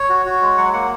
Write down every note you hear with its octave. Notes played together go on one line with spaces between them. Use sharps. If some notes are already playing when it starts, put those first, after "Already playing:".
Already playing: C#5
F#4
F#4
G#3
F#3 F#5
A#3 F#5